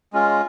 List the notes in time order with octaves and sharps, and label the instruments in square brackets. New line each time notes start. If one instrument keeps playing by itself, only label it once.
[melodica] G#3 C#4 F4